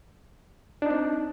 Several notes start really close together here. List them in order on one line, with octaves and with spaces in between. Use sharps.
D4 D#4 C4